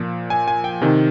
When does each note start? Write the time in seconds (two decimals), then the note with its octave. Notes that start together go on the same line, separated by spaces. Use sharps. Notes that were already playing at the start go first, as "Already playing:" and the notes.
Already playing: A#2 F3
0.30 G#5
0.48 G#5
0.64 G5
0.81 C3 D#3